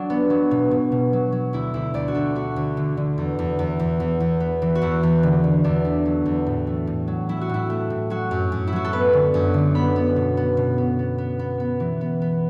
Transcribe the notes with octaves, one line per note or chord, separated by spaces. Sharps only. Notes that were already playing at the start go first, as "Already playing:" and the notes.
Already playing: F#3 D4
B3
F#3
B2
B2
B2
F#3
F#3
D2 E4
D2 E4
D2 D5
F#4
D2 A4
A3 F#4
D2
D3
D3
E2
E2
E2
E2
E2
E2
B3
E3
F#4
E2 E4
E2
D3
D3
E2 D4
A3
F#3
E2
A2
A3
A2
F#3
F#3 E4
F#4
A2 E4
A3
A2
F#3 F#4
F#2
F#2
E4
F#3 F#4
A4
B3 B4
D3
F#2
D3
B3 B5
B3
B2
B3
B2
B3
B3
B3
B3
B3
E3
B3
B3